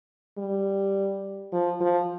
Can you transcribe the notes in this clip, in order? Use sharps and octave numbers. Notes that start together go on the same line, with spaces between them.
G3
F3
F3